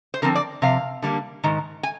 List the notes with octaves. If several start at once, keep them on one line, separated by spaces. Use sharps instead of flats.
C5
D3 F3 C4 A#4
D5
C3 F3 F5
D3 G3 A#3
G#2 D#3
G#5